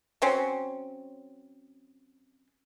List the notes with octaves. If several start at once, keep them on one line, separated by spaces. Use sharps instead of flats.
F#3 C4 C#4